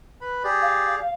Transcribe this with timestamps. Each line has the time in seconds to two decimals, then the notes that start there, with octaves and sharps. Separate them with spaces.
0.21 B4 B5
0.44 G4 G#4 D5
0.62 F5